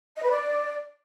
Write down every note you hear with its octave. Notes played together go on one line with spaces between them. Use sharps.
D#5
B4
D5